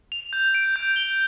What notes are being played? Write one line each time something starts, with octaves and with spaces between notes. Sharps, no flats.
F7
G6
D7
G6
G7